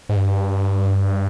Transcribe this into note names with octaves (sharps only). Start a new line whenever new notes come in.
G#2
G2